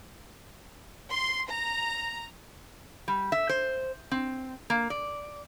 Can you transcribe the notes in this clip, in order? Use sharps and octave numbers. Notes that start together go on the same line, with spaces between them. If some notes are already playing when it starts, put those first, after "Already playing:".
C6
A#5
G3
E5
C5
C4
A#3
D5